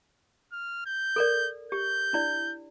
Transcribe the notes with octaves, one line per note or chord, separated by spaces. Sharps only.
F6
G6
A4 A#4 D5
G4 G6
D4 E4 D5